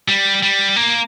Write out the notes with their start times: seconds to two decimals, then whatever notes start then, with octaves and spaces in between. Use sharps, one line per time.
0.08 G3
0.43 G3
0.76 A#3